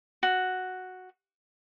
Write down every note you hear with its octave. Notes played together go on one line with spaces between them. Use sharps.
F#4